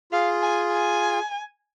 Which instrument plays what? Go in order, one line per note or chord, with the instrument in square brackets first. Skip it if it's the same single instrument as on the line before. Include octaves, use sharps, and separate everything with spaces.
[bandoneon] F4 G#4 [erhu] F5
[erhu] G#5
G#5